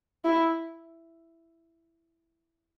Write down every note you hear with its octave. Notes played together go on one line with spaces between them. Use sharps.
E4